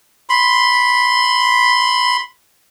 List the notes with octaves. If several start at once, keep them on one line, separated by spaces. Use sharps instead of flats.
B5 C6